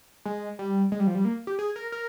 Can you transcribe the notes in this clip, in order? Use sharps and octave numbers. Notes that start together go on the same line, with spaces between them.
G#3
G3
G#3
G3
F3
G3
A#3
G4
G#4
A#4
A#4